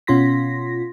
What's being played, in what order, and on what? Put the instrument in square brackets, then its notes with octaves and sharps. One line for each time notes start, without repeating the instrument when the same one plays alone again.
[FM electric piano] B2 C#4 F4 C6 A#6 B6